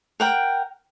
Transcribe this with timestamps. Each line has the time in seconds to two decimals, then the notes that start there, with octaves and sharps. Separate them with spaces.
0.20 A#4 F#5 G5